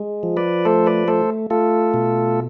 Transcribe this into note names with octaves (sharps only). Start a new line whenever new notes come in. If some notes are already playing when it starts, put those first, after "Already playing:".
Already playing: G#3
F3
B4 D5
A3 A4 C5
B4 D5
A3 A4 C5
A3 F4 A4
B2